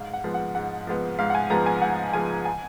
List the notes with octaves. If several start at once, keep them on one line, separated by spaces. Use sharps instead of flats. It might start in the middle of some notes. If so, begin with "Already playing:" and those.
Already playing: G#2 F5
F#5
F3 G#3 B3
F#5
G#2 F#5
F3 G#3 B3
G#2 F5
F#5
G#5
F3 G#3 B3 A#5
G#5
G#2 F#5
F3 G#3 B3 G#5
G#5